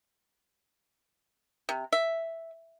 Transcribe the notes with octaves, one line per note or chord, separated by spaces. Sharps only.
C3
E5